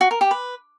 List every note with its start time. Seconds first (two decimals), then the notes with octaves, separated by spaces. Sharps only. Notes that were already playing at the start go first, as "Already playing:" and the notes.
0.01 F#4
0.11 A#4
0.21 G4
0.31 B4